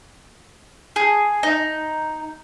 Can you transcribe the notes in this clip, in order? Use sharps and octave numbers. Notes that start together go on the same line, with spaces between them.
G#4
D#4